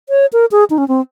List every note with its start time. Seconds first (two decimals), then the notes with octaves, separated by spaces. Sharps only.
0.09 C#5
0.33 A#4
0.52 G#4
0.70 D#4
0.78 C#4
0.88 C4